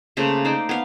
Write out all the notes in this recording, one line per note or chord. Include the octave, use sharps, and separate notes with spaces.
C#3 A3 A#3 C5
D#4 C5 D5
B3 F5